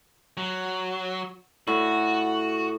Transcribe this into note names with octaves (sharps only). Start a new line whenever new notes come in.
F#3
A2 F#4